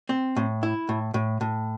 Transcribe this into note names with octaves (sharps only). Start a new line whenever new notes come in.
C4
A2
E4
A2
A2
A2